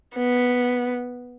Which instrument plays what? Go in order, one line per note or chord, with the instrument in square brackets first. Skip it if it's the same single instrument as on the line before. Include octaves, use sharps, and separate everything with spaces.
[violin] B3